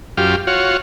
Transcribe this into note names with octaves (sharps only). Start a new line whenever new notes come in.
F#2 F4 G4
F4 F#4 C#5